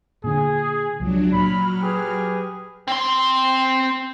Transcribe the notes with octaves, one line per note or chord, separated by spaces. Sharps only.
A#2 D3 G#4
C#2 F3 F#3 D4
A#2 F#3 B5 F6
G4 G#4 B4
C4 C6